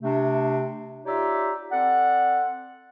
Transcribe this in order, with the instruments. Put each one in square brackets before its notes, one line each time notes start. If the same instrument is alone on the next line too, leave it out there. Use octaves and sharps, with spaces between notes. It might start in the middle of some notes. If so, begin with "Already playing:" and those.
[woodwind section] C3 A3 D4
D#4 F4 G4 C#5 D5 E5
C4 A4 D5 F#5